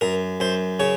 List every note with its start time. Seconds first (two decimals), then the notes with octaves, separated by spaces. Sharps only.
0.01 F#2 A#4
0.40 F#2 C5
0.80 C#3 C#5